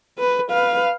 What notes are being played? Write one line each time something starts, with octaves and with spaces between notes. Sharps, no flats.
B4
B4 F5